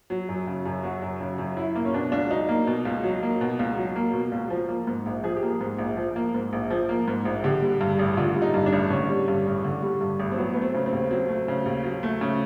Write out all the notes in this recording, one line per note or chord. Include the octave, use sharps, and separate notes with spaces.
F#3
F#2
C#3
F#2
F#3 F#4
F#2
C#3
F#2
F#3 E4
A#3
C#4
B2 D4
C#2 D4
F#3 D#4
A#3
B2
C#2
F#3
A#3
B2
C#2
F#3
A#3
B2
C#2
F3
A#3
G#2
A#1
F3 G#4
G4
A#3
G#4
G#2
A#1
F3
A#3
G#2
A#1
F3
A#3
G#2
A#1
D3 G4
G3
G2
A1
D3 F4
G3
D#4
G2
D4
A1
D3 C#4
G3
G2
A1
D3
G3
G2
A1
C4
F#3 B3
A3 B3
C4
C#3
C4
D#2
F#3 C4
A3
C#3
D#2
F#3
A3
C#3